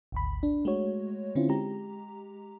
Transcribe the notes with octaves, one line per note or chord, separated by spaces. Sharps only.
G#1 D2 B5
D4
G#3 A3 F#4 C#5
D3 C4 C#4 E4 F4
G#3 G4 A#5